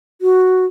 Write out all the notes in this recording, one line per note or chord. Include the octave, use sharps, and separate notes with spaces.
F#4